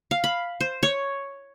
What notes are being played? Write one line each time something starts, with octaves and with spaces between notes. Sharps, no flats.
F5
B5
C5
C#5